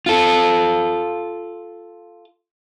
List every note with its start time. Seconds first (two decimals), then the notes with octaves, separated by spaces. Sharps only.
0.06 F4 A4